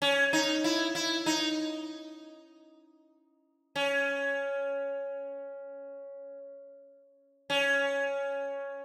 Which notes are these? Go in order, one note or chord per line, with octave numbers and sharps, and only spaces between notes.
C#4
D#4
E4
E4
D#4
C#4
C#4